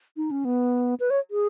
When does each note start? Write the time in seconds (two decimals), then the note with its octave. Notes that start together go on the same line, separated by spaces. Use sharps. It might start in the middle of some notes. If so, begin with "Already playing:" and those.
0.17 D#4
0.31 C#4
0.45 B3
1.00 B4
1.10 C#5
1.31 G#4